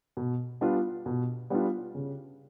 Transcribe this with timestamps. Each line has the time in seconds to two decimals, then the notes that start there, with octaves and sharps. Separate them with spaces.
0.17 B2
0.61 G3 B3 D4 F4
1.06 B2
1.50 G3 B3 D4 F4
1.95 C#3